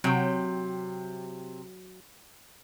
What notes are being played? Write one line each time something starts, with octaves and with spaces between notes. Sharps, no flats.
C3 F#3 G5